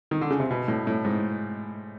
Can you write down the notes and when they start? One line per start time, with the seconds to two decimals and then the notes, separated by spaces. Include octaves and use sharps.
0.11 D#3
0.21 D3
0.30 C#3
0.40 C3
0.51 B2
0.68 A2
0.87 A2
1.05 G#2